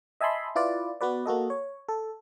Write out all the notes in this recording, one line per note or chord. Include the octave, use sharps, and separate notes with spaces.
D#5 E5 G#5 A5 B5 C6
E4 F4 B4 D5
B3 F#4 B4 D5
A#3 F#4 A4 D#5
C#5
A4